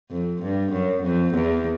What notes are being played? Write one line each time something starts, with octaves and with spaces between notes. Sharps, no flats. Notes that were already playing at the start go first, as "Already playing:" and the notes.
F2
G2
F#2
F2
E2